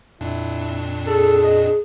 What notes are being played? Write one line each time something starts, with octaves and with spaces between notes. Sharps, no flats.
F2 A#2 D4 E4
G#4 A4
D#5